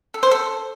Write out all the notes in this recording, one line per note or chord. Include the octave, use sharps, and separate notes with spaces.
A4
C5
A4